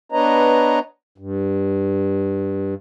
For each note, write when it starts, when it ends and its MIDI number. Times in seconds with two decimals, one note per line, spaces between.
0.12 0.79 59
0.12 0.79 62
0.12 0.79 71
0.12 0.79 73
0.12 0.79 75
0.12 0.79 82
1.18 2.74 43